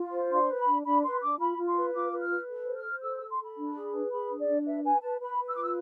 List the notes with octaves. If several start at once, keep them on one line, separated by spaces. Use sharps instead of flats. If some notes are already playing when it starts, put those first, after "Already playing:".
Already playing: F4
C5
D4 C6
B4
B5
D4
D4 B5
B4 C6
D4 D6
F4 B5
F4
C6
B4
F4 D6
B4
F6
B4
A4
C5
F6
C5
A4 E6
A4 E6
C6
A4 B5
D4
G#4
B4
G#4 B5
D4
D5
D4
B4 E5
B4 G#5
B4 A5
B4 B5
B4
E6
F4 D6
E6